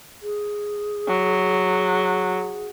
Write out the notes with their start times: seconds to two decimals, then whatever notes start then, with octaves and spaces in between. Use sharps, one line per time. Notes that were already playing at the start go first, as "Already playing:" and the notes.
0.23 G#4
1.08 F#3